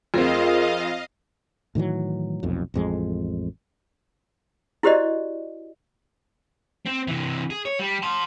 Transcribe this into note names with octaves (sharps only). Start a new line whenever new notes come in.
F2 C4 F4 G#4 A#4 D#5 F5
A2 D#3 E3 F#3
F1 B1 F2
A1 F2 G#3
E4 F#4 G4 C5 D5 D#5
C4
C3 E3
G#4
C#5
G3
A5 C6